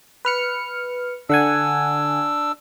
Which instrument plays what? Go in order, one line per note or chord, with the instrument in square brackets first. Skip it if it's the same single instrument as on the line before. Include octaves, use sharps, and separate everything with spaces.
[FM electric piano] B4 F6 C#7
[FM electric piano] D3 F#5 G#5 [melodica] D4 E6